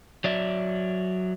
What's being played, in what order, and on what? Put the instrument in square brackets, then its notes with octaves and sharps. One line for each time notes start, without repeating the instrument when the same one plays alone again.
[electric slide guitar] F#3 D5 E5